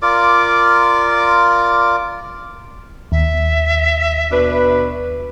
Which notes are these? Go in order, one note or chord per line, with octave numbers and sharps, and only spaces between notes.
F4 A#4 D5 D6
D#2 E5
B2 D4 B4